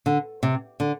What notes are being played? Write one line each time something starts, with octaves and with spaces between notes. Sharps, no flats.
D3
C3
D3